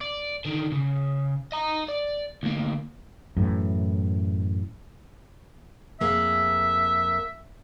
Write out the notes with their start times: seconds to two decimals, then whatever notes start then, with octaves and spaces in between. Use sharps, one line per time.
0.01 D5
0.45 D3 D#3
0.72 C#3
1.52 D#5 A#5
1.88 D5
2.43 D2 A#3
3.37 F#2 A2 E3
6.01 F2 A#3 G#4 E5